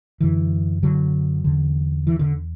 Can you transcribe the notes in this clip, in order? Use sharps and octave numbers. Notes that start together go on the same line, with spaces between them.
F#2 D3 E3
D3 F#3
E2 D3
E3
D3